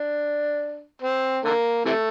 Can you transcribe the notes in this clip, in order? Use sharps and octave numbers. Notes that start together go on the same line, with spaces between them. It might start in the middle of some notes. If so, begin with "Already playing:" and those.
Already playing: D4
C4
D3 A#3
C3 E3 A3